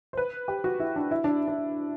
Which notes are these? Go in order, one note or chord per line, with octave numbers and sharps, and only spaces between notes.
C5
B4
G4
F#4
E4
D4
E4
D4
D4